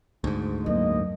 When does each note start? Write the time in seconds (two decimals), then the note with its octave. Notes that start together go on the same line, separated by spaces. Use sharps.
0.24 G#1 D2 G#2
0.66 F#2 F#3 A#3 D#5